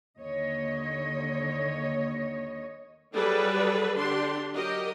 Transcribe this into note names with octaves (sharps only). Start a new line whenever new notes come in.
D#2 D3 C#5 D#5
F#3 G3 G#4 A4 B4
D3 D4 G4 C6
F#3 G4 A#4 D#5